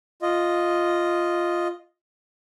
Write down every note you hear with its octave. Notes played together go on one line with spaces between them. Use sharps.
F4 D#5